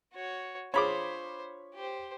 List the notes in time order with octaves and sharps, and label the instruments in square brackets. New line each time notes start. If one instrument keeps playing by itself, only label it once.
[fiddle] F#4 C#5
[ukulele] D4 F4 G#4 [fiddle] C5 [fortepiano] C#5 B5 D6
[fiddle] G4 C5